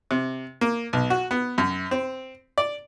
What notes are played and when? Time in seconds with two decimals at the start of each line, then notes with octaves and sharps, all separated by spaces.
0.11 C3
0.61 A#3
0.93 B1
1.10 F#4
1.31 B3
1.58 F#2
1.91 C4
2.58 D5